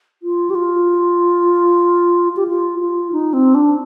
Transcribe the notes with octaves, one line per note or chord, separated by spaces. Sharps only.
F4
G4
F4
G4
F4
F4
D#4
C4
D4